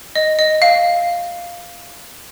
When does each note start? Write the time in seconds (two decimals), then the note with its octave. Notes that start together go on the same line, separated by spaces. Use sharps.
0.15 D#5
0.39 D#5
0.62 F5